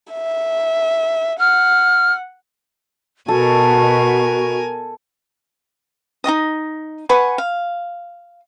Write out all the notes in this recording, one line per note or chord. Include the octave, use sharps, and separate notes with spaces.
E5
F#5 F6
B2 F#4 A4 A#4 G#5
D#4 F#4 D#5 D#6
B4 F#5 G#5 C#6
F5